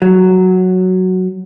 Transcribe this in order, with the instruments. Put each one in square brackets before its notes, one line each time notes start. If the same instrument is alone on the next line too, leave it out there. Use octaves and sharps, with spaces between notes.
[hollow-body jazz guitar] F#3